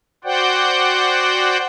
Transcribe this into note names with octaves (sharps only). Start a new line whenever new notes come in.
F#4 C5 D5 F#5 G5